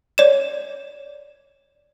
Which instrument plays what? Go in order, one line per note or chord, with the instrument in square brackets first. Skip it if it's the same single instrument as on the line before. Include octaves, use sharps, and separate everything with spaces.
[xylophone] C#5 D5 E7